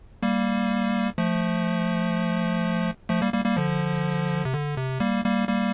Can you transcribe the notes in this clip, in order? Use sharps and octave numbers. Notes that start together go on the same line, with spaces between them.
G3 A#3
F3 A3
F3 A3
G3 A#3
G3 A#3
G3 A#3
D3 F3
C3
D3
C3
G3 A#3
G3 A#3
G3 A#3